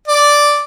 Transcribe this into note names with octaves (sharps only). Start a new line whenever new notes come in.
D5